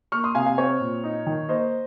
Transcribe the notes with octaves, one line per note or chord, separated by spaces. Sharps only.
A#3 C#6 F6
C6 D#6
C3 F5 G#5
F5 G#5
C4 C#5
A#2
D#4
D#3
A#3 C5 D#5